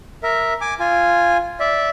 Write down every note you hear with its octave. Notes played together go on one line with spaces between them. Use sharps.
A#4 E5
G#5 D6
F4 G#5
D5 E5